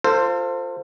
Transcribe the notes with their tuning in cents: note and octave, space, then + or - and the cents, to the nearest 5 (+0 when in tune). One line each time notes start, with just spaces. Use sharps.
F4 +5 A4 +35 C5 +0